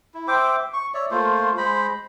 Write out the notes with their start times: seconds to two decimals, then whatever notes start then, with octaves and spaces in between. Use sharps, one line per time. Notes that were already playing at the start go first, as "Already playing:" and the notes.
0.14 E4
0.28 C5 E5 G5 D6
0.73 C#6
0.94 C#5 D5 E5
1.11 A3 A#3 F4 C5
1.57 G#3 C5 B5